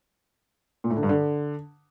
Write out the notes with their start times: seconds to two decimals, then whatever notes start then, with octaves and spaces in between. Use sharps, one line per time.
0.84 A#2
0.90 A2
0.97 D3
1.03 G2
1.09 D3